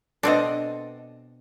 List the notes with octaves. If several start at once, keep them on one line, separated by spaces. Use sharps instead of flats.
B2 C4 D4 A4 D#5